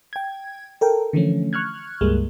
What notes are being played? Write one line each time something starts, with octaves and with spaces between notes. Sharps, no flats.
G5 G#6
A4 A#4 G5
D3 E3 F3 A3 C#4
C#6 F6 F#6 G#6
C#2 G2 G3 G#3 A#3